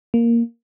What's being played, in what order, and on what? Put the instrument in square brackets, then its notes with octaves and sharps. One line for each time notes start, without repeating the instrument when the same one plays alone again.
[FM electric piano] A#3